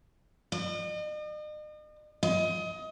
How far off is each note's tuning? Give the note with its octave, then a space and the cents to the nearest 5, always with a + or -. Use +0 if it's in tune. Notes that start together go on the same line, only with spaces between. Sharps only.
D#5 -40
D#5 +25